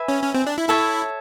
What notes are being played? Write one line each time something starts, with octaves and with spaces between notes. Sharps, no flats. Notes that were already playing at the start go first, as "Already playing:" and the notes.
Already playing: B4 E5 G#5 B5
C#4
C#4
C4
D4
E4
E4 A4 C#5 E5